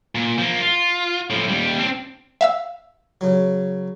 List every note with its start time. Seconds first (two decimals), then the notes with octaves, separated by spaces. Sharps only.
0.15 A#2
0.38 F3 A#3
0.62 F4
1.30 A2 F3
1.48 D#2 G3
1.79 C4 D4
2.41 E5 F5 E6
3.21 C#3 F#3